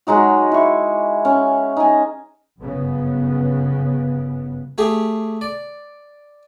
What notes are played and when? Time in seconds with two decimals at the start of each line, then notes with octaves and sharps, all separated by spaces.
0.07 F#3 G#3 D#4 F#4
0.52 E4 C#6
1.25 C#4
1.77 D#4 G#5
2.58 G1 F#2 C#3 B3
4.78 A3 G4 G#4
5.41 D5